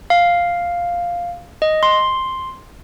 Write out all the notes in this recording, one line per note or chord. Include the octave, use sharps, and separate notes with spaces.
F5
D#5
C6